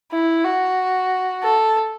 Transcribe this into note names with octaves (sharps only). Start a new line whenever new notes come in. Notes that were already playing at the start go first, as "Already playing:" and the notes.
E4
F#4
A4